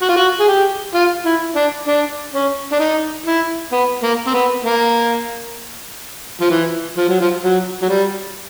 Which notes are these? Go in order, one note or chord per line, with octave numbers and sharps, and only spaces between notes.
F#4
F4
F#4
G#4
G4
F4
E4
D4
D4
C#4
D4
D#4
E4
B3
A#3
C4
B3
A#3
F3
E3
F3
F#3
F3
F#3
F#3
G3